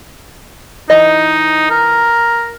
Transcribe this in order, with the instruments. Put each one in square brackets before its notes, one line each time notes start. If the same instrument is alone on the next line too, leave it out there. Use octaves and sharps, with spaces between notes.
[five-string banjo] E3 D#5 [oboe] D#4
[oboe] A#4